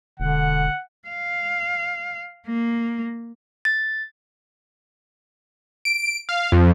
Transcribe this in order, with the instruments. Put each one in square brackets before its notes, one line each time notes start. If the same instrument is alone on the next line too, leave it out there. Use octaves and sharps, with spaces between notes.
[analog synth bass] E1 [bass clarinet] D3 [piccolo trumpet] F#5
[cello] F5
A#3
[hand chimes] A6
[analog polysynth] D7
F5
F2